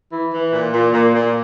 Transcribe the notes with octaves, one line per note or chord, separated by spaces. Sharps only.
E3
E3
A#2
A#2
A#2
A#2